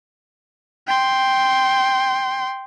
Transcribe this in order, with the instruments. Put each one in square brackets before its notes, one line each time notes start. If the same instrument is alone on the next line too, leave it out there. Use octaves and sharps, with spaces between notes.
[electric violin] G5 C6